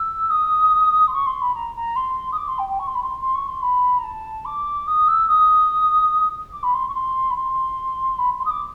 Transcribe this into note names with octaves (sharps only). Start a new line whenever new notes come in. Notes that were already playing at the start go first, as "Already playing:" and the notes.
Already playing: E6
D#6
C6
C#6
C6
B5
A#5
A#5
C6
D#6
D6
C6
G5
G5
C#6
C6
B5
C6
C6
C#6
C6
B5
A#5
A5
D6
D#6
E6
D#6
D6
B5
C6
C#6
C6
B5
C6
B5
C6
D#6
D6